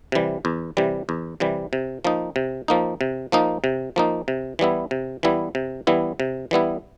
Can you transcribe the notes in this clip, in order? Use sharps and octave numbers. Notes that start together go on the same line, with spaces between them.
C3 E3 G3
E2
C3 E3 G3
E2
C3 E3 G3
C3
F3 A#3 D#4
C3
F3 A#3 D#4
C3
F3 A#3 D#4
C3
F3 A#3 D#4
C3
E3 G3 B3 E4
C3
E3 G3 B3 E4
C3
E3 G3 B3 E4
C3
E3 G3 B3 E4